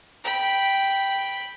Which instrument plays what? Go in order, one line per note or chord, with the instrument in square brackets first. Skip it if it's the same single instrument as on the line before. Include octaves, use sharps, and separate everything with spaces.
[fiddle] G5 B5